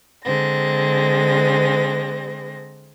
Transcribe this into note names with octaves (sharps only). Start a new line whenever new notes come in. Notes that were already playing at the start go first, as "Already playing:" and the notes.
D3 G#3 C4 A#6